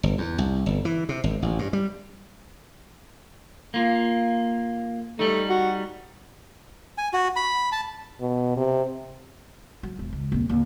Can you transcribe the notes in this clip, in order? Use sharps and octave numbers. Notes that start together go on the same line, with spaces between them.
G1
E2
C2
G1
E3
C3
G#1
A1
G2
G3
A#3 F4
G3 A3 D#4
F#4
G#5
F#4
B5
A5
B2
C3
F#3
E1
C#2
D#1 C4
D#2 D3